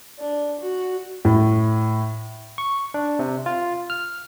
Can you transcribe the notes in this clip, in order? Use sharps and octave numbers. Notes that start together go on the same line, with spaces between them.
D4
F#4
A2
C#6
D4
C3
F4
F6